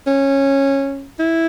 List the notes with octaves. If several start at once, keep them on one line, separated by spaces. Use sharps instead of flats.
C#4
E4